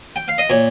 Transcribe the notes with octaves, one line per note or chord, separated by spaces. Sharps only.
G5
F5
D#5
A#2 C#5